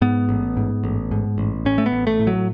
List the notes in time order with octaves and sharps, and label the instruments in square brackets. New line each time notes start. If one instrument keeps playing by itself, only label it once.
[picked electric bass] G#2 B3
A1
G#2
A1
G#2
A1
A2 C#4
A3
B3
A1
A3
A2
F#3